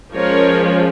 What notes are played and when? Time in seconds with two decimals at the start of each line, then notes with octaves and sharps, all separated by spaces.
0.14 F3 G#3 C#4 A#4 C#5